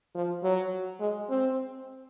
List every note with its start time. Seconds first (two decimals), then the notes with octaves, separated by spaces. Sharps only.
0.15 F3
0.43 F#3
1.00 G#3
1.29 C4